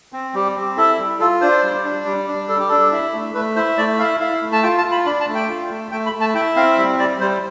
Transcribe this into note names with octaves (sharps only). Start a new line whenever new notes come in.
C4
G3 G4
C4
E4 A4
G3
F4 A4
D4 C5
G3
D4
G3
D4
G3 A4
G4
D4 A4
E4
A3
A3 B4
E4 C5
A3 D5
E4 F5
E4 F5
A3
A5
F4 G5
A5
F4
B5
D4 B5
A5
A3
G5
F4
A3
A3 G5
B5
A3
A5
E4 G5
C4 F5
G3 E5
G3 D5
G3 C5